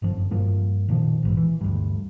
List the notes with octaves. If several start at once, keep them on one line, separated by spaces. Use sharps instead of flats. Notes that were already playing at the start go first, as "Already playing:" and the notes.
G1 F#2 F3
G2 F3 A#3
F2 A#2 D#3 F3
A#1 G#2 E3
E3
D2 G2